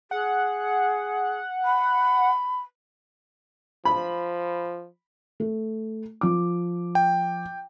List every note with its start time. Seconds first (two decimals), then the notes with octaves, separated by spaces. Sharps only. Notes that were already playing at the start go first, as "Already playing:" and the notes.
0.11 G#4 F#5
1.65 B5
3.85 F3 B5
5.40 A3
6.21 F3 D6
6.95 G5